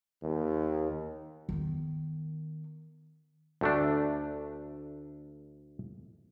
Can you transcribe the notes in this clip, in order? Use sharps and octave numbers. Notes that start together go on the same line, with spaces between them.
D#2
D#3 B3
D2 A3 D4